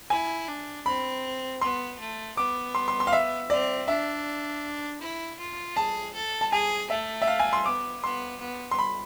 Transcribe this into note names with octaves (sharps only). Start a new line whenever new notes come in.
E4 G#5
D4
C4 B5
B3 C6
A3
B3 D6
C6
C6
C6
F5
E5
C4 D5
D4 E5
E4
F4
G#4 A5
A4
A5
G#4 G#5
A3 E5
E5
F5
G#5
C6
B3 D6
B3 C6
B3
C6
B5